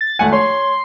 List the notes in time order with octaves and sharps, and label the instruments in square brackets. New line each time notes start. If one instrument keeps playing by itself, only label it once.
[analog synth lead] A6
[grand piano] G#1 A3 G#5 [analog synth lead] F#5
[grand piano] C#5 [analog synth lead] C6